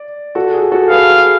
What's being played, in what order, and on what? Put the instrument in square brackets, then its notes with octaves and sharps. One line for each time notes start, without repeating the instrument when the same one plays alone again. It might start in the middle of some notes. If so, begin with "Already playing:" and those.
Already playing: [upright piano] D5
F#4 A4
G#4
F#4 A4
[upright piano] G#4 B4 [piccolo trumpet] F5